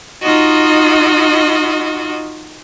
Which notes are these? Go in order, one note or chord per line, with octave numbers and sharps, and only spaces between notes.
D#4 F4 F#4 D#5